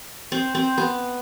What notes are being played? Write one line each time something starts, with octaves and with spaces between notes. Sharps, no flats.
C4
C4
B3